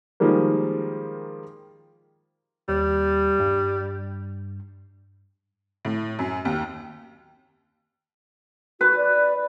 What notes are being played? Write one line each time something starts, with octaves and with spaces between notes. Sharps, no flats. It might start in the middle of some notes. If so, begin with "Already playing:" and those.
D#3 F3 G3 G#3 A#3
D#2 G3
G2
A2
F#2
D#2
F#4 B4
D5